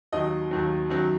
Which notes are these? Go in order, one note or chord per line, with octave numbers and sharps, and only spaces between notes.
D#2 D#3 F#3 D#5
D#2 D#3 F#3
F#2 D#3 F#3